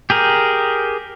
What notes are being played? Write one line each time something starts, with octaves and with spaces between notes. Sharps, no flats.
G4 G#4 A#4